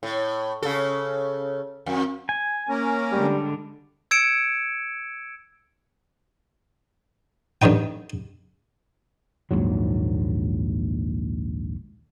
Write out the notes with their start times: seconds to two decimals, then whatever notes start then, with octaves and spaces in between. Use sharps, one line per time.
0.03 A2
0.63 C#3 A4
1.86 F2
2.29 G#5
2.69 A#3 C#4 A#4
3.12 D3 G3 G#3
4.11 E6 G#6 C#7 D7 E7
7.62 A1 D3 D#3 D#4 G5
9.51 A#1 D#2 G#2 F#3